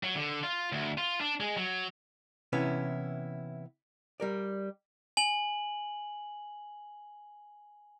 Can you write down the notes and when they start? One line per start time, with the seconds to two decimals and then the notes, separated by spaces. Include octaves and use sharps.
0.03 F#3
0.16 D3
0.43 F4
0.72 D2
0.98 F4
1.21 D4
1.40 G#3
1.57 F#3
2.53 C3 E3 B3 C#4 E4
4.20 G3 A#4 D5
5.17 G#5 F#7